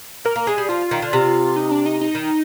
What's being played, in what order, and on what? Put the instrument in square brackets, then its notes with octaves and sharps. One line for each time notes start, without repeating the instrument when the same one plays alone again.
[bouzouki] A#3 [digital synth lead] A#4
[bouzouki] A#3
[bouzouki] G#3 [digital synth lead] G#4
[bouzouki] G3
[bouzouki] F3 [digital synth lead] F4
[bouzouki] D#3
D3
C3
[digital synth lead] D#4
D4
D#4
D#4
[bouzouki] D#3